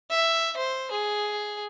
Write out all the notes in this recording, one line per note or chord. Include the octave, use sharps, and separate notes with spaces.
E5
C5
G#4